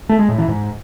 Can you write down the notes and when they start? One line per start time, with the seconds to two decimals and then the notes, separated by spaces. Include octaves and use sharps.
0.09 A3
0.19 G#3
0.29 A2
0.38 E3
0.48 G#2